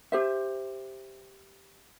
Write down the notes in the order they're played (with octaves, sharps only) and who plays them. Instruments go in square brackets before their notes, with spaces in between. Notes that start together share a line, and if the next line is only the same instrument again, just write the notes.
[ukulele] G4 C5 E5